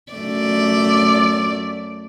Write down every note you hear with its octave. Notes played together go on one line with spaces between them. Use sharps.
F#2 A3 D5